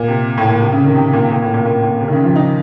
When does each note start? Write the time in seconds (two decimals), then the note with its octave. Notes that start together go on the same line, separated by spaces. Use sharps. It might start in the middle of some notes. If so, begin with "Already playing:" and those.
Already playing: A#2
0.08 C3
0.37 A2
0.49 A#2
0.61 C3
0.72 C#3
0.84 D#3
0.96 C3
1.13 A#2
1.31 A#2
1.42 A2
1.54 A#2
1.66 A#2
1.83 A#2
2.01 C3
2.08 D#3
2.12 C#3
2.24 F3
2.36 D#4